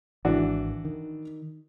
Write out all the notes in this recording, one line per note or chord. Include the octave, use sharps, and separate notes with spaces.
G#1 E3 D4 F#4
D#3